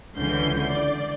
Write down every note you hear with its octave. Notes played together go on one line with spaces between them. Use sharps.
C#2 D3 E3 C#4 G6 C7
D5